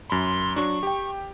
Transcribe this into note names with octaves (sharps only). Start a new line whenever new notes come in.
F#2 B5 C6
F#3 D4 C#6
G4 G5